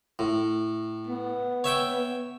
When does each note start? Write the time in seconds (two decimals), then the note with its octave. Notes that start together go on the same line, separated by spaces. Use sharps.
0.19 A2
1.07 B3
1.64 C#5 E5 G5